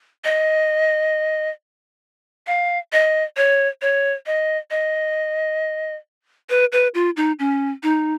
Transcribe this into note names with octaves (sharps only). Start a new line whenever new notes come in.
D#5
F5
D#5
C#5
C#5
D#5
D#5
B4
B4
F4
D#4
C#4
D#4